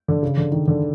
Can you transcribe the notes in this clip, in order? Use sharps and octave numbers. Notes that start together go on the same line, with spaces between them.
D3
C#3
D3
D#3
D3